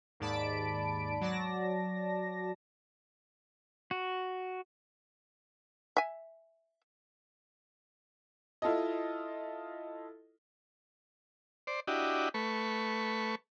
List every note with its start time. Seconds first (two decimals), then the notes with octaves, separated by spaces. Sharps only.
0.20 D#2 G#2 D5 A5 B5 D7
1.21 F#3 D5 A5 A#6
3.91 F#4
5.97 E5 G#5
8.62 E4 F4 A4 D#5
11.67 C5 D5
11.87 D4 E4 F#4 G4 D#5
12.34 A3 B4 C#6